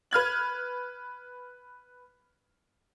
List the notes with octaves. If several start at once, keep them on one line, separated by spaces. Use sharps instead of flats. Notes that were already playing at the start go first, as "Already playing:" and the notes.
B4 F6 G#6 F#7